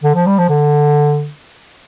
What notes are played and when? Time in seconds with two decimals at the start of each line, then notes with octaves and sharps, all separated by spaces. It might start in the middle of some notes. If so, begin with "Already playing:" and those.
0.03 D3
0.15 F3
0.26 G3
0.38 F3
0.49 D3